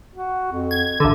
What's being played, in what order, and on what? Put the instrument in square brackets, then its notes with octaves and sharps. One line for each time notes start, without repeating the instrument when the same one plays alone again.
[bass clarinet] F#4
F2
[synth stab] G#6
[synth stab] A1 D3 [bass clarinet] A4